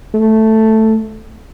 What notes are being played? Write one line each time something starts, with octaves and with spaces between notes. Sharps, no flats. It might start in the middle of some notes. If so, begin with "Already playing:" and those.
A3